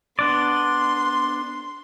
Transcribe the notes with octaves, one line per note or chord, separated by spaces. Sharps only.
B3 D4 D5 C6